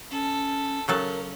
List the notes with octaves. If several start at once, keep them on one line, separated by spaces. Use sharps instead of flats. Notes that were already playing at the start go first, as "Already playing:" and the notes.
C#4 A4
C#3 F#3 C#4 A4 A#4